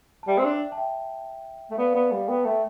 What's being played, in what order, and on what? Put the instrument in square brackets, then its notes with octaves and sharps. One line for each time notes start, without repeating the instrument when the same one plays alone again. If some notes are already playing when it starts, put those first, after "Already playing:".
[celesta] A5
[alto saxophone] G3 [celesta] E5 G5
[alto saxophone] C4
D4
[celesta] A5
E5 G5
[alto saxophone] A3
[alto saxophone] B3 [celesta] D5 F5
[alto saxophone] B3 [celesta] D5 F5
[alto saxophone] G3 [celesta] D5 F5
[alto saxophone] B3 [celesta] G5
[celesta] A5
[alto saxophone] A3 [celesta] E5 G5